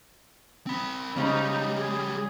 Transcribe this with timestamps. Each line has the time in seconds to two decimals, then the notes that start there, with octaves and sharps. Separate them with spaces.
0.67 C4 B5
1.16 C#3 G3 G#3 C#4 D#4
1.71 G#4